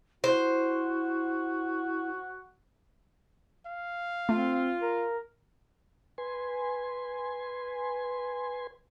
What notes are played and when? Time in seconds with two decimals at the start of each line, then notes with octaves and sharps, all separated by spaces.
0.24 E4 F#4 C5
3.66 F5
4.29 A3 C4 F4
4.82 A#4
6.18 B4 G#5 C6